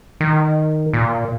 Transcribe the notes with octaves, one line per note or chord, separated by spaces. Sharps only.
D#3
A#2